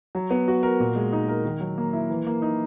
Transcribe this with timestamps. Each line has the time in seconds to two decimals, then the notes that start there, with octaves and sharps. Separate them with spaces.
0.15 F#3
0.31 B3
0.48 F#4
0.63 A#4
0.80 A#2
0.96 G#3
1.12 D#4
1.28 A#4
1.45 D#3
1.61 F#3
1.78 A#3
1.93 E4
2.10 E3
2.26 A#3
2.42 D#4